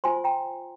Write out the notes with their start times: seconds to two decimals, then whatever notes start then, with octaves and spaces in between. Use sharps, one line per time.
0.04 F4 C5 G#5 C6
0.24 G5 A#5